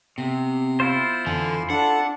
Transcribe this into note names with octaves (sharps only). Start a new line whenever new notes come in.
C3 B3
E4 F4 C5
F2 D3 E3 G#5
D4 A4 F#5 A5